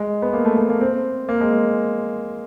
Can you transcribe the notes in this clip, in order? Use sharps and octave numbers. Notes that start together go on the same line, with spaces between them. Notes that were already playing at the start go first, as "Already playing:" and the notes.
Already playing: G#3
B3
A#3
A3
A3
A#3
C4
A#3
G#3